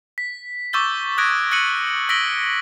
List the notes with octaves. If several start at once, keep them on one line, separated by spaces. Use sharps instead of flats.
B6
C#6 D6 E6 G6 A6 G7
D#6 F#6 G#6 A#6 D7
E6 F#6 A#6 C#7 D#7 F#7
E6 A#6 B6 D7 F#7 G7